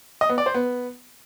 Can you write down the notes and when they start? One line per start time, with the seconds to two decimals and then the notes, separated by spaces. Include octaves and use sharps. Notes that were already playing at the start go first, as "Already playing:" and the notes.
0.21 D#5
0.29 B3
0.38 D5
0.46 C5
0.55 B3